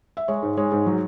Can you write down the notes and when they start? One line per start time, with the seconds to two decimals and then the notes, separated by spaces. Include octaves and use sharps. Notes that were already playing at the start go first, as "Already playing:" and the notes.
0.17 E5
0.28 G#3 C#5
0.42 G#2
0.57 G#3 C#5
0.72 G#2
0.86 F#3